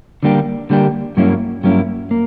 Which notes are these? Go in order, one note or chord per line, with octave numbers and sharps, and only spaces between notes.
D3 G3 A#3 D4 G4
D3 G3 A#3 D4 G4
G2 F#3 A#3 C#4 E4
G2 F#3 A#3 C#4 E4
A#3